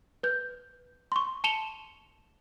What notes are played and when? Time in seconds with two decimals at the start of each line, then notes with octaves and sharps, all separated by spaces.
0.23 B4 G6
1.12 C6 C#6
1.44 A5 C#7 E7 F7 G7